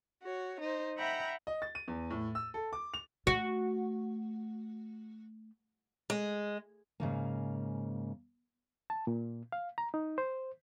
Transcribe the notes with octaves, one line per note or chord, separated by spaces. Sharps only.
F#4 C#5
D#4 C5
E5 F#5 G5 A#5 B5
D#5
A6
D#7
E2
A2
E6
A4
D6
F7
A3 F#4
G#3
G#2 C#3 A#3
A5
A#2
F5
A#5
D#4
C5